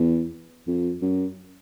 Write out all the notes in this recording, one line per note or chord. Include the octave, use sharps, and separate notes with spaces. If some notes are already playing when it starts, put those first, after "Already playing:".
Already playing: E2
F2
F#2